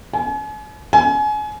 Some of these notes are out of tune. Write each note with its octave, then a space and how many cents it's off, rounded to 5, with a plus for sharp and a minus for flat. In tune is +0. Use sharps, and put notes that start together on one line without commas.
G#5 +40
G#5 +30